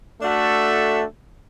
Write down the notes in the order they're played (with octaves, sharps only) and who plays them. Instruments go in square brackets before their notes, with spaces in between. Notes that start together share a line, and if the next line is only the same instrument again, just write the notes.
[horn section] A3 D4 F#4 A4 E5